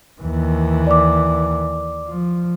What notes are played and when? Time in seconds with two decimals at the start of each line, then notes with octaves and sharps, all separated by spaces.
0.21 D#2 E3
0.87 D5 D6
2.08 F3